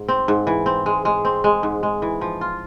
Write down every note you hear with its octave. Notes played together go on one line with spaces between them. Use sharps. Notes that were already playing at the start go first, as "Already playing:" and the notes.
Already playing: G#2
C4
G#2
E3
C4
G#3
G#3
C4
G#3
G#2
G#3
E3
F3
F4